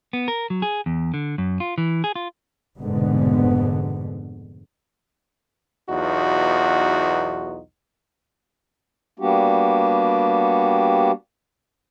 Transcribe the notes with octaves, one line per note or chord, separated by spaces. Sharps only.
B3
A#4
F#3
G#4
E2
D3
F#2
F4
E3
G#4
F4
F1 G#2 B2 D3 B3
B1 E2 D#4 F4 F#4
G3 A#3 B3 D4 F#4 G4